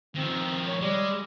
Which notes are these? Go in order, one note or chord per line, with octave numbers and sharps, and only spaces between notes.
D#3 F3 C4
C#5
G3 G#3